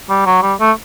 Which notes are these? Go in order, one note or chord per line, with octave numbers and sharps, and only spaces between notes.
G3
F#3
G3
A3